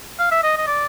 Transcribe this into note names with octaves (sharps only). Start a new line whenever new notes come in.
F5
E5
D#5
D#5
D5